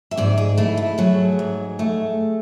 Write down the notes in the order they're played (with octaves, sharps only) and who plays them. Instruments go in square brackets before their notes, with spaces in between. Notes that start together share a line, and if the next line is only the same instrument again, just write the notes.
[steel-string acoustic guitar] E5
G#2 D5
G#4
A3 E4
E4
F#3 G#4
G#2
A3